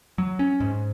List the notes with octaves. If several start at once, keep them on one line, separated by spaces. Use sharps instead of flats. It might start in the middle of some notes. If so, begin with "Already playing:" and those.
F#3
C#4
G#2